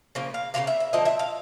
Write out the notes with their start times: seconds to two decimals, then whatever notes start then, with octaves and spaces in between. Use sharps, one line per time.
0.15 C#3 F3 A#3
0.34 F5
0.54 C#3 F3 A#3 F5
0.67 E5
0.80 E5
0.93 D3 F3 A#3 D#5
1.05 E5
1.19 F5